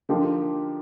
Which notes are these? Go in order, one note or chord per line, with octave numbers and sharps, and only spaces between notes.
D3 F3 A#3 D#4 G4